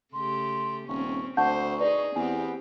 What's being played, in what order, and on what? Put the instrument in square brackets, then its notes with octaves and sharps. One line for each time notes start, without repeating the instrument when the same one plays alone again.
[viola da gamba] C#3 A3 G4 [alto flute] C6
[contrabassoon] D#1 [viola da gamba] C4 C#4 [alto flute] C#6
[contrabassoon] D2 [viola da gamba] C5 [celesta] F#5 A5 G6 [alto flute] C#6
[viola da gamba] D#4 G#4 [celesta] B4 D5
[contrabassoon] E2 [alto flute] B3 [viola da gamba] C4 G4 [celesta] G#5